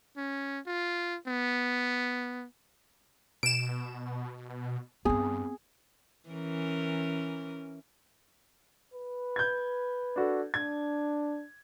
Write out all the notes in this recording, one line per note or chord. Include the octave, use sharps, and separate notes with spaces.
C#4
F4
B3
B2 D7 E7
G2 B3 C4 G#4
E3 C#4 A#4
B4
G6 G#6
D4 F#4 A4
D4 G#6